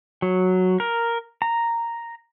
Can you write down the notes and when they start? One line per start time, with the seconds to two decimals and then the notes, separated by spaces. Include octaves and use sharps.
0.22 F#3
0.80 A#4
1.42 A#5